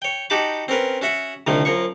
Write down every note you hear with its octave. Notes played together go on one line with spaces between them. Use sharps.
C#5 G5
D#4 F#4 G4 A5 B5 D6
C4 C#4 A#4 B4
C#4 F#4 E5 F#5
C2 D3 D#3 F3 A3 A#3
F#2 F3 A#3 C#6